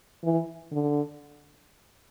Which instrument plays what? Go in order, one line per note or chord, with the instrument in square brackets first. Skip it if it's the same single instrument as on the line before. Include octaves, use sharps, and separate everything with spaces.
[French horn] E3
D3